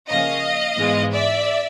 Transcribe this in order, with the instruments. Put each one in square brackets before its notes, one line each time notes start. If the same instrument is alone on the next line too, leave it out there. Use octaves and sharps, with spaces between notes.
[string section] C#3 F3 A#3 C#4 D#5 F5
G#2 E3 G#3 B3
D5 E5